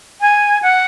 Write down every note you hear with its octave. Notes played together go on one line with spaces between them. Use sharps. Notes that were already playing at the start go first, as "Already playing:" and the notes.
G#5
F#5